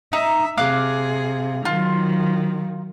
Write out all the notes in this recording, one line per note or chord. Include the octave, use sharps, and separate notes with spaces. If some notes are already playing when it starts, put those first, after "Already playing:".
D#4 E5
C3 G#4 F5 D6 F#6
D#3 F#3 F4